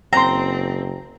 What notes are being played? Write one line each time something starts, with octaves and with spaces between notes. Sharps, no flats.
F#1 C4 G5 A#5 C6